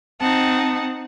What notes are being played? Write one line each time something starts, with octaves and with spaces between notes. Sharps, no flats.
C4 D#4 F#5 A5